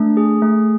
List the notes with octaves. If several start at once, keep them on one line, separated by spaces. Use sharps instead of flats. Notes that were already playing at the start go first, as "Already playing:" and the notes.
Already playing: A3 D4
G#4
A3